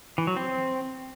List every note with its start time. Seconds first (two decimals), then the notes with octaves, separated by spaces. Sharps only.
0.18 E3
0.27 F#3
0.37 C4